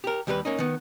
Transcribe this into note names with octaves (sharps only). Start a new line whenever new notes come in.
G4 A#4
D#2 G3 G4 A4 B4
A#3 C#4 D#4
D#3 B3